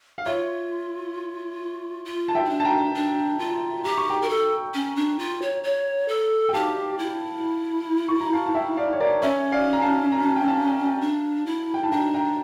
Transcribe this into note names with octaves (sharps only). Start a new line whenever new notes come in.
F5
F4 C#5 E5
F4
A5
E5 G5
E4
D4
A5
G5 A#5
D4
F4
G4 A#5
C#6
G5 A#5
A#4
A4
C#4
D4
F4
C#5
C#5
A4
G5
G4 F5 A5
E4
C#6
A#5
F5 A5
A5
E5 G5
D5 F5
C#5
A#4 D5
C#4 C#5 E5
D5 F5
A#5
F5 A5
A#5
A5
G5
F5 A5
D4
E4
G5
A5
D4 G5 A#5
G5 A#5